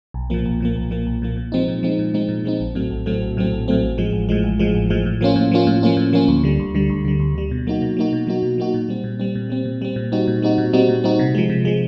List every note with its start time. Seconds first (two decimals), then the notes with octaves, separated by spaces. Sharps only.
0.14 B1
0.30 A#2 F3 A#3
0.46 B1
0.60 A#2 F3 A#3
0.76 B1
0.91 A#2 F3 A#3
1.06 B1
1.22 A#2 F3 A#3
1.37 A#2
1.52 F3 G#3 C4 D#4
1.68 A#2
1.83 F3 G#3 C4 D#4
1.99 A#2
2.14 F3 G#3 C4 D#4
2.29 A#2
2.44 F3 G#3 C4 D#4
2.60 A#1
2.75 A2 F#3 A3 C4
2.90 A#1
3.06 A2 F#3 A3 C4
3.22 A#1
3.37 A2 F#3 A3 C4
3.52 A#1
3.68 A2 F#3 A3 C4
3.83 A1
3.98 A2 F3 G#3
4.13 A1
4.29 A2 F3 G#3
4.44 A1
4.59 A2 F3 G#3
4.75 A1
4.90 A2 F3 G#3
5.06 A2
5.21 F3 A#3 C#4 F4
5.36 A2
5.51 F3 A#3 C#4 F4
5.67 A2
5.83 F3 A#3 C#4 F4
5.97 A2
6.13 F3 A#3 C#4 F4
6.28 D2
6.43 D3 G3
6.59 D2
6.75 D3 G3
6.90 D2
7.05 D3 G3
7.20 D2
7.35 D3 G3
7.51 B2
7.67 F#3 A#3 D#4 F#4
7.82 B2
7.97 F#3 A#3 D#4 F#4
8.13 B2
8.27 F#3 A#3 D#4 F#4
8.43 B2
8.58 F#3 A#3 D#4 F#4
8.74 A#2
8.89 G3 C4
9.04 A#2
9.19 G3 C4
9.35 A#2
9.50 G3 C4
9.65 A#2
9.82 G3 C4
9.96 A#2
10.12 G3 C4 D#4 F#4
10.27 A#2
10.42 G3 C4 D#4 F#4
10.58 A#2
10.73 G3 C4 D#4 F#4
10.89 A#2
11.04 G3 C4 D#4 F#4
11.19 C3
11.35 F3 G#3
11.50 C3
11.65 F3 G#3